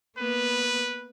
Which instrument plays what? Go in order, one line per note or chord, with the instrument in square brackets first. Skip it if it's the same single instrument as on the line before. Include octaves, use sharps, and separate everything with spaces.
[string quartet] A#3 B3 [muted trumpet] B4